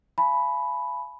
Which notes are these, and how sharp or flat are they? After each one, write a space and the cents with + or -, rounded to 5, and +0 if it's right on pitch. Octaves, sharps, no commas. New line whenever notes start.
F5 -45 G#5 +35 B5 +0